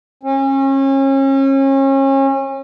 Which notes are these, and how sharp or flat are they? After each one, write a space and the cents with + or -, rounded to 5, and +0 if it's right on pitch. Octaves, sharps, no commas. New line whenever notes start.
C#4 -35